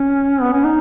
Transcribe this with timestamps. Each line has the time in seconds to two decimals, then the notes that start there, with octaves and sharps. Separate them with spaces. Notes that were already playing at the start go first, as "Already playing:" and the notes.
Already playing: C#4
0.41 B3
0.52 C#4
0.64 D#4